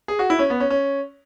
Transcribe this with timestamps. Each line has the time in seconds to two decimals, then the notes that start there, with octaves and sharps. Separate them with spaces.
0.08 G#4
0.19 F#4
0.30 E4
0.39 C#4
0.50 B3
0.60 C#4
0.70 C#4